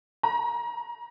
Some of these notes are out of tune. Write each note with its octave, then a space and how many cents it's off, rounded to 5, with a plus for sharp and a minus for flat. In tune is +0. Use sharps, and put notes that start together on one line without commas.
A#5 +30